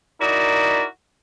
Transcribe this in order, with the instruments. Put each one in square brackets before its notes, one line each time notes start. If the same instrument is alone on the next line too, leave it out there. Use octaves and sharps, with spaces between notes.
[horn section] D#4 E4 F#4 A#4 D5